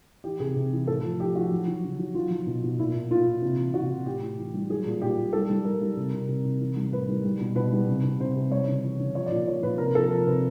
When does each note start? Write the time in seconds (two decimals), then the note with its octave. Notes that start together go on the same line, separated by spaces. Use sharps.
0.24 E3 G4
0.40 C3 G#4
0.56 C3
0.72 E3
0.87 A2 A4
1.03 F3
1.19 F3 G4
1.35 F3 F#4
1.52 F#3
1.67 F#3
1.84 C#3
1.99 F#3
2.15 F#3 F4
2.31 F#3
2.46 B2
2.63 B2
2.79 A#2 E4
2.94 A#2
3.10 A#2 F4
3.27 A#2
3.42 C3
3.58 E3
3.74 C3 F#4
3.90 C3
4.06 A2 G4
4.22 A2
4.38 E3
4.54 G3
4.69 F#3 G#4
4.86 A#2
5.01 A#2 G4
5.17 A#2
5.33 G3 A4
5.50 G3
5.65 G3 A#4
5.82 G3
5.97 C3
6.13 C3
6.29 C3
6.45 C3
6.60 E3
6.76 G3
6.92 A2 B4
7.09 G3
7.25 G3
7.41 B2
7.55 B2 B4
7.73 G3
7.88 C3
8.04 C3
8.20 C3 C5
8.36 C3
8.51 G3 C#5
8.68 C#3
8.83 E3
9.00 C#3
9.15 F3 C#5
9.26 A#2 D5
9.47 F3 C#5
9.62 A#2 B4
9.78 C3 A#4
9.95 F3 A4
10.10 F3 A#4
10.27 C3 B4